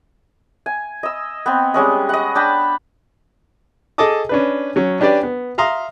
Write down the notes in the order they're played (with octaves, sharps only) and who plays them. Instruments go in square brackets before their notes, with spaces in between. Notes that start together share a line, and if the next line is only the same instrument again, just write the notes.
[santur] G#5
D#5 E6
B3 C4
G3 G#3 C#4 D#5
D#5 F#5
D4 G5 A5 B5
[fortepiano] G#4 A4 D#5 A5 D6 D#6
C#4 D4 B4
F#3 C#4
C#4 D4 G4 B4 D5
B3
E5 F5 A#5 C6 D#6